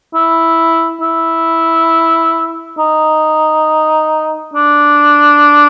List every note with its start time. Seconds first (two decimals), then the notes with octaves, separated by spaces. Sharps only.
0.14 E4
1.01 E4
2.78 D#4
4.54 D4